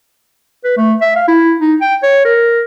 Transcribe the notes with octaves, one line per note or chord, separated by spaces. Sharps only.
B4
A3
E5
F5
E4
D#4
G5
C#5
A#4